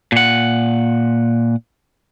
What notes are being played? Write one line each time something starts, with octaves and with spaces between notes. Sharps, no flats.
A#2 F#5